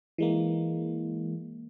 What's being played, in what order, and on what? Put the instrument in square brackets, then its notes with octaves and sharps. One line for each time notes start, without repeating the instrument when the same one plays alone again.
[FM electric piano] E3 G#3 A#3